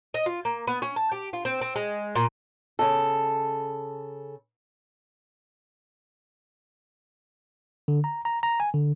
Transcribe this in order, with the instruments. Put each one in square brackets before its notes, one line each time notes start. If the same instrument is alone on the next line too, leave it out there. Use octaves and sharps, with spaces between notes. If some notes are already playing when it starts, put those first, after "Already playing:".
[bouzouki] D#5
F4
A#3
B3
C#4
A5
G4
F4
C4
C4
G#3
A#2
[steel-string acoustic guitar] C#3 A4
[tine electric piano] D3
A#5
A#5
A#5
G#5
D3